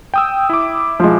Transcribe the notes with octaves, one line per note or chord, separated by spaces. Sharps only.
G5 D#6 E6
E4 D6
F3 G#3